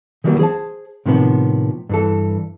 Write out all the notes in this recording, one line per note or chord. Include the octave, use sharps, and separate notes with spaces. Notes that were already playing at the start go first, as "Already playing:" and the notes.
D#3 E3 F#3 G3 A#3 B3
G#4 C5 A5
A2 C3 D#3 F3 B3
G2 E3 A4